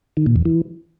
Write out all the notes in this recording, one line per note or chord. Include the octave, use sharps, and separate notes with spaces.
D#3
A#2
E2
E3